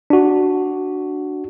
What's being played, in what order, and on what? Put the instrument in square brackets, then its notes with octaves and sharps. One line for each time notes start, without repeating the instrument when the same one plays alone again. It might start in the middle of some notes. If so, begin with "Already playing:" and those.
[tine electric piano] D4 F#4